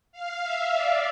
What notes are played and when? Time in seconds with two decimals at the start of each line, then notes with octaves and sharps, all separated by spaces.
0.12 F5
0.42 E5
0.73 D5